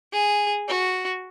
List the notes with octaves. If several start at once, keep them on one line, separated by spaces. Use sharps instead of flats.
G#4
F#4